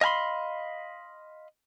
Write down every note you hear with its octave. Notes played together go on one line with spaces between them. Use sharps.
D#5 F5 G#5 B5 C6